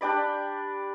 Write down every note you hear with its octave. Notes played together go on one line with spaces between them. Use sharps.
D4 G4 D5 B5